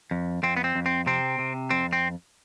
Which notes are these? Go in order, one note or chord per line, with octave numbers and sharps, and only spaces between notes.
F2
F2 C4
B3
C4
F2
C4
C3 C4
C3
F2 C4
C4